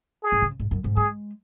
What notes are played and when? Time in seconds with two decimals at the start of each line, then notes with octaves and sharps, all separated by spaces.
0.23 G#4
0.32 G#2
0.42 C#3
0.60 G#2
0.71 F#2
0.84 G#2
0.96 G#3 G#4